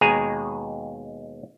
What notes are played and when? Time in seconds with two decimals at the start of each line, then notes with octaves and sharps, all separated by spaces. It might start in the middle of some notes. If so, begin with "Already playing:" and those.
0.01 D#2 B2 G#3 G#4 G#5 A#5